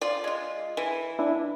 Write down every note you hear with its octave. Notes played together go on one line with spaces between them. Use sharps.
F4 D5
G#3 F4
E3
D4 E4